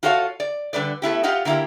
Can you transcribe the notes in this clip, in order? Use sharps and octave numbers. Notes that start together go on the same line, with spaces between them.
F4 F#4 A4 C#5 D#5 F5
D5
D3 G3 B4 D5
A3 B3 E4 G4
F4 G4 D#5 F5 F#5
D3 A#3 E4 F4 G4